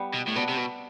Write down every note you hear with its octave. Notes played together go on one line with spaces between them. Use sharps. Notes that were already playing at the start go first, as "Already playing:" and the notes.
Already playing: G3 B3
B2
A2
B2 B3 D4
C3
B2